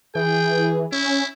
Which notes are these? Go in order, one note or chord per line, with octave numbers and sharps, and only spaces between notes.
E3 G#4 G5
C#4 E4